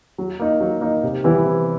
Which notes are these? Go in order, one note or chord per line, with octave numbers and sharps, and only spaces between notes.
F#3
A#3 D#4
F#3
A#3 D#4
C3
E3 G3 B3 E4
C3